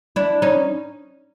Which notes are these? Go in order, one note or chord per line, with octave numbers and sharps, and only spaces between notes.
D4 E4
C#4 D#4